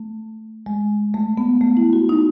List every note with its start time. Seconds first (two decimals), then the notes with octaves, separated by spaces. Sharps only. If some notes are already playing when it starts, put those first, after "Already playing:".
Already playing: A3
0.66 G#3
1.14 A3
1.38 B3
1.61 A3
1.77 E4
1.93 F#4
2.09 D#4